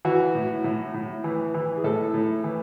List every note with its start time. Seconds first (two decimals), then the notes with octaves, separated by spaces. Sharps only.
0.05 E3 F#4
0.35 A2
0.64 A2
0.94 A2
1.24 E3
1.54 E3
1.77 G#4
1.84 A2 A4
2.14 A2
2.44 E3